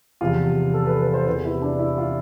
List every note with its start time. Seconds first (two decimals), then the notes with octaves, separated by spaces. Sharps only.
0.21 E2 C3 F3 F4
0.74 A4
0.86 B4
1.01 B4
1.14 C5
1.26 E2 C3 E3 B4
1.45 E4
1.62 D4
1.79 E4
1.98 F4